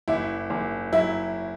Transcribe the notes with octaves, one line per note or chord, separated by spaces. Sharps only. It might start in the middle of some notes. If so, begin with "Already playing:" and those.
F#1 E4
F#1
F#3 E4